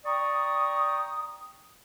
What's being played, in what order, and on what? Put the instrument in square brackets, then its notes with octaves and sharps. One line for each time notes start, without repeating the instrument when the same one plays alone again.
[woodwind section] D5 G5 A#5 C#6 D#6